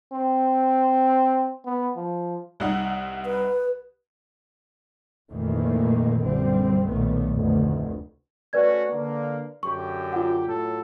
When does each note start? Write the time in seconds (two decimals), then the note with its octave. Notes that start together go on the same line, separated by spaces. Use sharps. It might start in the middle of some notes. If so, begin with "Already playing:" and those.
0.13 C4
1.65 B3
1.96 F3
2.60 C2 D#4 F#5
3.26 B4
5.30 F1 A#2 D#3 E3 A3 A#3
6.24 A#1 F#2 D3 G3 C4
6.84 B1 A#2 D#3 A3 B3
7.33 F1 D2
8.53 A3 C#4 F#4 B4 D5 G#6
8.90 D3 A#3
9.63 F#2 D3 G4 C#6
10.13 F4 F#5
10.46 A2 F#3 A4